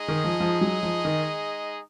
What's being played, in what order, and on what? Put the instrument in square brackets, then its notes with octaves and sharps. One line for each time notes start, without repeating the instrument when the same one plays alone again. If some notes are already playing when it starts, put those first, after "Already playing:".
Already playing: [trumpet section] G#3 D#4 G#4 D#5
[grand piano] D#3
F3
F3
F#3
F3
D#3